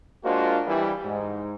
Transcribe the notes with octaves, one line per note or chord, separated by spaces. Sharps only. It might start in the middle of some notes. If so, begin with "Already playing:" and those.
G#3 A#3 D4 F4 F#4 C5
E3 G3
G#2